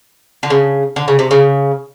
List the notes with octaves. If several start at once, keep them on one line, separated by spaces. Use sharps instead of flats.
D3
C#3
D3
C#3
C3
C#3